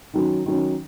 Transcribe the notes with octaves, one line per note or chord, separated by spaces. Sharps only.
D#3 F#3 C#4
D#3 F#3 C#4